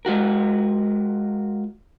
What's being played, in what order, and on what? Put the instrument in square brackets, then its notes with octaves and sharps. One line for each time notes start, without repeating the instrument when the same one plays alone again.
[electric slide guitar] G#3 F4 F#4 A#4